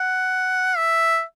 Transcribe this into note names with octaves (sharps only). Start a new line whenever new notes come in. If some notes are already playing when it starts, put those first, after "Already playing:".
Already playing: F#5
E5